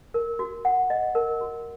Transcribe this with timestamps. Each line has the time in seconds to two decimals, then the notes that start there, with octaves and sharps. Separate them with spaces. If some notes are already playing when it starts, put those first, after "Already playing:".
0.14 A#4
0.39 F#4
0.65 F#5
0.90 D#5
1.15 A#4
1.41 F#4